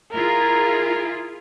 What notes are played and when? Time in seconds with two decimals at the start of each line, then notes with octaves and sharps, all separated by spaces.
0.12 E4 F4 G#4 A#4